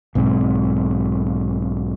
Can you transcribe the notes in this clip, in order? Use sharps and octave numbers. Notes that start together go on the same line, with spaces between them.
B1 G#2 C4